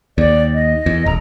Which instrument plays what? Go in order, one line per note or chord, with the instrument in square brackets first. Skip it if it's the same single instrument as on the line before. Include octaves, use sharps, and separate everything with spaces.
[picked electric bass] D#2 [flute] D5
[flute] D#5
[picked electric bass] E2
[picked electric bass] D#1 [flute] A#5